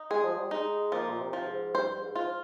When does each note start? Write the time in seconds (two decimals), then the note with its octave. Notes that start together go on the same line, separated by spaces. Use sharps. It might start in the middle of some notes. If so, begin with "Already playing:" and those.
Already playing: D#4
0.10 G#3 G#4
0.24 F3
0.38 G3
0.51 G#3 D#4
0.92 F3 A#3
1.09 A#2
1.20 C3
1.33 F3
1.46 G#2
1.74 G2 C5
2.01 G#2
2.16 F4
2.23 F3